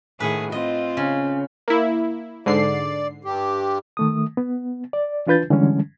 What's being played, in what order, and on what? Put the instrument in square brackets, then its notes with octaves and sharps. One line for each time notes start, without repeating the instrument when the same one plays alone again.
[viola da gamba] A2 D#3 G#4 [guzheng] B4 F#5
[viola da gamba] C4 F4 [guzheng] D#5
[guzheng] C#3
[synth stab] A#3 E4
[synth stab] G#2 D3 C7 [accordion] D5
[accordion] G2 G4
[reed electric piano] D#3 A3 D#6
B3
D5
E3 D4 F4 B4 G6 A6
D3 E3 G3 G#3 C#4